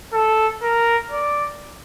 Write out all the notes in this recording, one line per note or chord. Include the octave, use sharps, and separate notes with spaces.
A4
A#4
D5